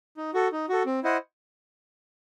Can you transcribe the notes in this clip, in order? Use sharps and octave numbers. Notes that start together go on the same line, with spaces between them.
D#4
F#4 A4
D#4
F#4 A4
C4
E4 C5 D#5 F#5